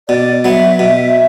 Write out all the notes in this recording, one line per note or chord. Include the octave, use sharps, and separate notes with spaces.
B2 D5
F#3 B3 E5
B2